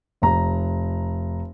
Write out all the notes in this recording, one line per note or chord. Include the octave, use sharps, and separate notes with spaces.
F1 A#5